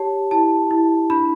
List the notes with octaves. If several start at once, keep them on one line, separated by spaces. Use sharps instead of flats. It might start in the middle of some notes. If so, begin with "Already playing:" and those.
Already playing: G4 C#5 A5
E4 A5
E4
D4 B5